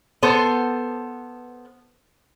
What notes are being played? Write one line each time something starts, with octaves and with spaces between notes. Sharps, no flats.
B3 A4 C5